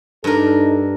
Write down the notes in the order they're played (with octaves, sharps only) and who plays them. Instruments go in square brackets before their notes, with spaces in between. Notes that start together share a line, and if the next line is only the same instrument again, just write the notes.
[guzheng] G2 A#4 [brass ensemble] D#4 A4